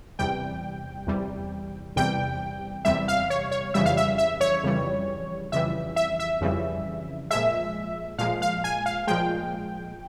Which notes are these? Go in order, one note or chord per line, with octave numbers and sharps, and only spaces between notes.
E2 C3 G3 G5
E2 C3 G3
E2 C3 G3 G5
E2 C3 G3 E5
F5
C#5
C#5
F2 C#3 E3 G3 E5
F5
E5
E5
C#5
F2 C#3 E3 G3
F2 C#3 E3 G3 E5
E5
E5
F2 C#3 E3 G3
A#2 F3 G#3 E5
A#2 F3 G#3 F5
F5
G#5
F5
A#2 F3 G#3 G5